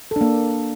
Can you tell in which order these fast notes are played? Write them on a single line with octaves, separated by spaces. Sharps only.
A4 D4 A#3